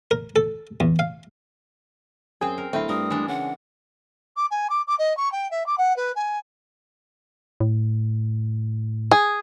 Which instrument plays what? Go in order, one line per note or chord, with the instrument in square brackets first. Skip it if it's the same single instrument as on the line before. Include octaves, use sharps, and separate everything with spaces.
[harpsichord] A#4
A4
E2
F5
[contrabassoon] F#2 [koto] C4 C5 G5 [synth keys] G#4
[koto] A#4
[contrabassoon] D1 [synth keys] A3 E4 [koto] C4 D#5 F5
[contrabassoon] G2 [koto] A#4 [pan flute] D#6
[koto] E3 G#3 D4
[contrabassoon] C#3 [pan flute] F#5
[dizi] D6
G#5
D6
D6
D#5
C#6
G5
E5
D6
F#5
B4
G#5
[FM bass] A2
[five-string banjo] G#4